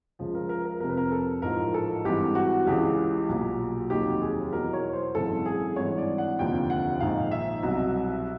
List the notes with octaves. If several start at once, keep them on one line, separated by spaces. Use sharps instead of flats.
C#2 C#3 F3
A#4
A#4
A#4
F1 F2 C3 A#4
B4
A#4
A4
A1 G#2 F3 A#4
A4
G#1 G2 E3 G4
F#4
C#2 C#3 E3 G4
B1 A#2 F#3
F1 D#2 D#3 F#3 G4
G#4
E2 B2 F#3 A#4
C#5
C5
G#1 F#2 C#3 E3 A4
G#4
G#1 G2 E3 C#5
D5
F#5
F1 D#2 D3 F3 G5
F#5
A#1 G#2 D#3 F5
E5
C2 B2 F#3